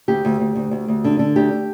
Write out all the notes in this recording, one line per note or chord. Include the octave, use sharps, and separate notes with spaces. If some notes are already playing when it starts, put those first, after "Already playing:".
D2 G4
D2
D2
D2
D2
D2
D3
D3
D2 G4